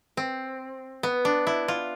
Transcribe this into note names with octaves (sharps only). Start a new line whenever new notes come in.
C4
B3
D4
E4
F4